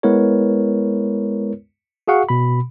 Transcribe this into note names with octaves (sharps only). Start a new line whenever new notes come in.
G#3 B3 E4 A#4 B4 C#5
F#4 G#4 F5 F#5 C#6
B2 B5